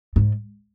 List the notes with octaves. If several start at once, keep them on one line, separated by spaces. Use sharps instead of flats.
G#2